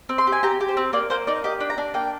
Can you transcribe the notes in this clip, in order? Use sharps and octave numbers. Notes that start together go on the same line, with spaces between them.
C4
C6
G4
G#5
G4 A#5
G4
C5
C4
A#3 D5
A#3 C5
D#4 D5
G4 D#5
D4
A#5
D4
A#3 G5